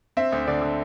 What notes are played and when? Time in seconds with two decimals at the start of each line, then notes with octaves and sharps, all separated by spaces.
0.17 C4 E5
0.32 D2
0.46 D3 D5
0.62 D3